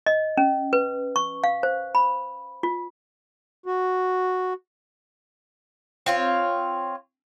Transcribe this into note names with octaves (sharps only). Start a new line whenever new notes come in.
D#5
C#4
B4
C#6
F5
C5
B5
F4
F#4
C4 F4 C#5